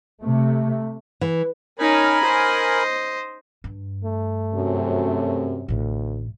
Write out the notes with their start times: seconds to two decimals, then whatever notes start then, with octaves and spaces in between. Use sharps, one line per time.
0.22 C3 A3
1.21 E3
1.79 C#4 D#4 A#4 G#5 B5
2.24 C5 D#5
3.64 G2
4.04 A3
4.55 F#2 C3
5.68 A1 D2 A2